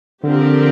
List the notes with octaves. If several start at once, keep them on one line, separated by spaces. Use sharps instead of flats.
D3 F3 C4 G4 A#4